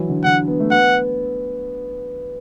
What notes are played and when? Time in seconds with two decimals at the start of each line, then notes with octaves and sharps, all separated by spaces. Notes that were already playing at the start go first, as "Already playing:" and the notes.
Already playing: E3 F#3
0.09 D3
0.24 D3 F#5
0.47 B3
0.60 A3
0.71 B3 F#5